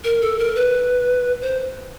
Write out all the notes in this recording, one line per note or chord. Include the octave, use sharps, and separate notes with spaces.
A#4
A4
A#4
B4
C5